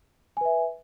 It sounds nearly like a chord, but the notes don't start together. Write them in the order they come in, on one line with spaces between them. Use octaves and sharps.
G#5 B4 E5